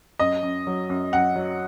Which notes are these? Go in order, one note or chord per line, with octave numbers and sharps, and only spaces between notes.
F#2 D#5
F#2
F#3
F#2
F#2 F#5
F#3